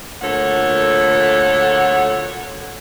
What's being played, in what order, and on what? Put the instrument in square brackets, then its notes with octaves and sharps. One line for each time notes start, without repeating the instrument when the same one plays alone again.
[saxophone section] D2 A#2 A4 C#5 F#5